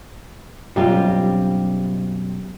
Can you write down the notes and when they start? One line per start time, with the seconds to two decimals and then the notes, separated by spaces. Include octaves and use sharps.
0.76 B1 F#2 G3 C4 F4 G4